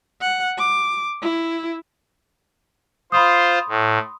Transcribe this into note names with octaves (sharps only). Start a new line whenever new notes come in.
F#5
D6
E4
F4 C5 B5 C6 D#6
A2